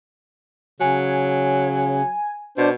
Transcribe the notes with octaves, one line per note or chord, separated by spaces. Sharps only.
C#3 F#3 G#5
B2 D4 C5